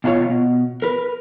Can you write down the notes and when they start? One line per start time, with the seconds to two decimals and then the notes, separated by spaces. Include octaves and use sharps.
0.04 B2 F4 A4 C#5
0.30 B2
0.82 A#4 B4